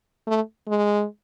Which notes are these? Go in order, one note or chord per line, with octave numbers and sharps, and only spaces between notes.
A3
G#3